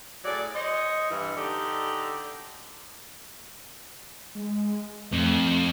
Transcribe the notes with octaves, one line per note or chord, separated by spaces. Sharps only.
A2 F#3 G#4 D5
C5 C#5 D#5
G2 E3
D3 D4 D#4 G4 A4
G#3
F2 A3